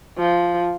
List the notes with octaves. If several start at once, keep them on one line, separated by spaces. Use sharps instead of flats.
F3